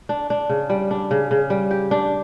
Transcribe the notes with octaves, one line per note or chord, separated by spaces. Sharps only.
D4
D4
C#3
G3
D4
C#3
C#3
G3
G4
D4